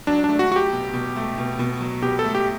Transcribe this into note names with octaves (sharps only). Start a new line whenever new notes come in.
F#3 D4
A3 D4
F#4
F#3 F#4
G4
B2
B2
A3
B2
B2
F#3
B2 G4
A4
A3
G4